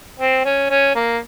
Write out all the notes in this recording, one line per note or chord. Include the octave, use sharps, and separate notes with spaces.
C4
C#4
C#4
A#3